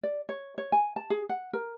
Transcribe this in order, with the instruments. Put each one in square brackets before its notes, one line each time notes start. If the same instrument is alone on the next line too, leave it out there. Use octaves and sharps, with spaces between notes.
[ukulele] D5
C#5
C#5
G#5
A5
G#4
F#5
A#4